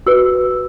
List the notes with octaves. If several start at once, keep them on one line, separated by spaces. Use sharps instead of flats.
F#4 B4 E6